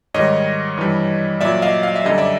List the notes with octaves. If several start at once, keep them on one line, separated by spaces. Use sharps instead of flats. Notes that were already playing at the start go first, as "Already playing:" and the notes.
G#2 D#3 G3 C#5 D#5
G2 E3 G3
A#2 F#3 D5 E5
D#5 F5
F5
E5
F#2 D3 G3 D#5
D5 E5